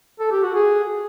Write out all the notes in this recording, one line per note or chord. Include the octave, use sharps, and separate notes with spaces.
A4
G4
F#4
G#4